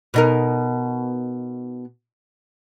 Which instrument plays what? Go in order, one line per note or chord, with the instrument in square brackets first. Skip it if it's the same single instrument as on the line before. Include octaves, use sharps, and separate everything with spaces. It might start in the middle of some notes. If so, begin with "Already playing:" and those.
[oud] B2 D#4 A#4